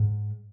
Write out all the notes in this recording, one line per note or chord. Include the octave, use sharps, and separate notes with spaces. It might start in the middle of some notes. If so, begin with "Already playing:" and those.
Already playing: G#2